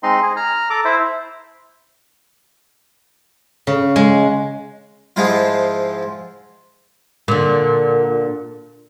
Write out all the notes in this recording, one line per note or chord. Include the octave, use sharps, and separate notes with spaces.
G#3 C4 D#4 D#5 C6
G#4
A#5 F6
A4 A#5 D6
E4 C5 E5
C#3
G#3
G#2 F3 G#3 E4 F4
A#2 D3